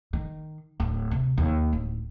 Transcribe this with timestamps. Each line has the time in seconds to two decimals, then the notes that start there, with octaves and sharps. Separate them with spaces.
0.13 D#3
0.80 D1
1.11 C3
1.38 D#2
1.73 D1